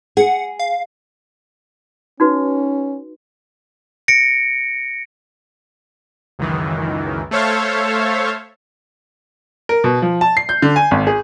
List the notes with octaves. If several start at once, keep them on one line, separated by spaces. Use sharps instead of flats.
G#4 F#5
F5
C#4 D#4 F#4 B4
A#6 C#7 D7
C#2 F#2 D#3 E3
A3 A4 C5 C#5 E5 F5
A#4
B2
F3
A5
C7
G6
D3
G#5
G#1
G#4